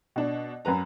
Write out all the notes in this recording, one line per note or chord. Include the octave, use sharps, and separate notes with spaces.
B2 D4
F#2 F#3 B4 A#5